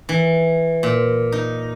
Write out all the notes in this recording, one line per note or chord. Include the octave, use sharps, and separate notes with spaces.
E3
A#2
D#4